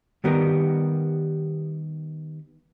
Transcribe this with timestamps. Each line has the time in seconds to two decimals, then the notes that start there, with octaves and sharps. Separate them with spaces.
0.24 D#3 G3 B3 G4 A#4